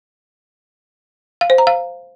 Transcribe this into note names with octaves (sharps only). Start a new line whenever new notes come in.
F5
C5
A#5
F5